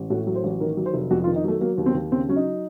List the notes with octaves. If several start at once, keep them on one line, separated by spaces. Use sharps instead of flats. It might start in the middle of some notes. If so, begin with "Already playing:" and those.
Already playing: A1
A2 F#4
F#3
C5
A1
D#3 A#4
F#3
C5
F1
F2 F#4
F4
D#3
D#4
F#3 A3
F#3 A#3
D#2
C4
D#2
C#3 C4
F#3 C#4
D#4